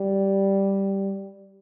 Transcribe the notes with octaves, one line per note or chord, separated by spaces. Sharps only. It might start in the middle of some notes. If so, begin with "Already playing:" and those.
Already playing: G3